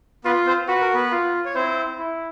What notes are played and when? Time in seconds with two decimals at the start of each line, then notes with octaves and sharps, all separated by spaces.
0.25 B3 F4 B4
0.46 C4 C5
0.68 F#4 B4
0.81 A#4
0.94 B3 B4
1.12 F4
1.45 C#5
1.55 C4 E4 C5
1.99 E4